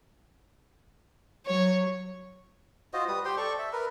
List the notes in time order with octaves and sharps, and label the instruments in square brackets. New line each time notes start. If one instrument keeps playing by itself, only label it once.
[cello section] F#3 [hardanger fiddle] C#5
[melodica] F4 F#4 C5 D#5
G3 B4 D#6
G4 C5 G5 C6
A4 D5 C#6
E5
A#4 B4